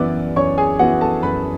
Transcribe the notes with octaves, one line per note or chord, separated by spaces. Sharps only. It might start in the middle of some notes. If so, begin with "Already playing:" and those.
Already playing: F#2 E3 B3 E4 D5 D6
F#2 C#5 C#6
G#4 G#5
E3 B3 E4 F#4 F#5
A4 A5
F#2 B4 B5